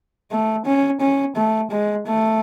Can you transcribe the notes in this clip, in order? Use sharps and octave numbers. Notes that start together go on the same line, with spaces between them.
A3
C#4
C#4
A3
G#3
A3